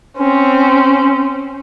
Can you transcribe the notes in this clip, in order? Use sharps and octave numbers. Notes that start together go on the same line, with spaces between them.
C4 C#4